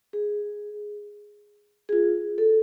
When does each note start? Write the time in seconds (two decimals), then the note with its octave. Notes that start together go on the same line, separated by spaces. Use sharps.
0.13 G#4
1.89 G#4
1.93 F4
2.38 A4